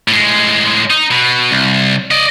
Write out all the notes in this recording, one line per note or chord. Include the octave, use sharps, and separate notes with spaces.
A2 G#3
D#4
B2
C2
D5 D#5